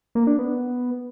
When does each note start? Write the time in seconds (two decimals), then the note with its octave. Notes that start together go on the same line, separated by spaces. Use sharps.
0.15 A#3
0.27 D4
0.39 B3